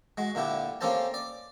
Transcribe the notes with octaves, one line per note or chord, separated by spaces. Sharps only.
G#3 F#4
A#2 D3 E4 G4
A#3 C#4 G4 A4 C5 A5
D5